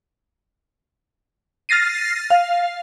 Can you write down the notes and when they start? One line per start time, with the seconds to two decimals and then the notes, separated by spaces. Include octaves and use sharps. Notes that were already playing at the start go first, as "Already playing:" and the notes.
1.69 F6 A6 A#6 C7 D#7
2.30 F5